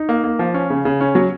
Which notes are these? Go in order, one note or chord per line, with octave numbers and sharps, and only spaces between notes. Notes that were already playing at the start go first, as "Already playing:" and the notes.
Already playing: D#4
A#3
A#3
F3
C#4
C#3
C#3
C#4
F#3